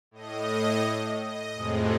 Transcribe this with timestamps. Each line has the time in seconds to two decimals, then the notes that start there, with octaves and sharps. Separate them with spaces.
0.11 A2 D#5
1.22 D#5
1.55 F2 A2 C3 G#3